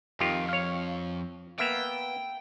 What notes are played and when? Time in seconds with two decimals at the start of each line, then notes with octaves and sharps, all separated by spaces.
0.20 F2 D#3 F4 G4
0.49 C#5 F5
1.59 A#3 B3 E5 G5